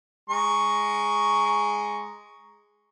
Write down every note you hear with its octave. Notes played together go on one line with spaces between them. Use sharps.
G#3 A#5 C#6